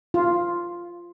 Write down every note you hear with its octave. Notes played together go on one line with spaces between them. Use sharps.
F4